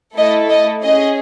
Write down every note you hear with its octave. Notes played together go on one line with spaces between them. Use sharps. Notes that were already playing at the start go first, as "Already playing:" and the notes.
A3 E4 A4 D#5
D#5
C#4 G#4 D#5